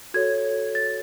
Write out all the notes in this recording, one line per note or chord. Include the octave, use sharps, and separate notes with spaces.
F#4 A4 C#5 G#6
A6